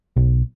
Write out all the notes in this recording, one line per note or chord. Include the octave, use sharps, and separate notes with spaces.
B1